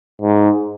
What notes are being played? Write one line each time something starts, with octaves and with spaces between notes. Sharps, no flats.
G#2